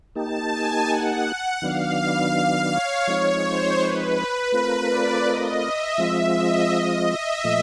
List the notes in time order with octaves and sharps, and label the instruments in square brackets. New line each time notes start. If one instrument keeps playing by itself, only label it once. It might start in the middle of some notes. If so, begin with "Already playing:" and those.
[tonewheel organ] A#3 D#4 G4 [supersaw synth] A5
[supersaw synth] G#5
F#5
F#5
[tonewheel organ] D#3 F#3 B3 D4 [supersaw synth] F5
[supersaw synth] C#5
[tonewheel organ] F3 G#3 C4 D#4
[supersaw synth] C5
B4
[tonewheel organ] A3 C4 F4 A#4
[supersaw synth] D5
D#5
E5
[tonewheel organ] F3 G#3 C4 F4
[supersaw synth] D#5
E5
[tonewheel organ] A#2 F3 A3